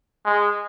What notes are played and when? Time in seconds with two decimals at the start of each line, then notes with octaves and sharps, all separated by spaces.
0.25 G#3